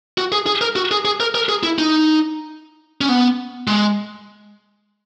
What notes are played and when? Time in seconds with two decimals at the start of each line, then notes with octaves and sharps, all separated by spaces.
0.18 F#4
0.32 G#4
0.46 G#4
0.61 A#4
0.76 F#4
0.91 G#4
1.05 G#4
1.20 A#4
1.35 A#4
1.49 G#4
1.63 E4
1.79 D#4
3.01 C#4
3.09 B3
3.67 G#3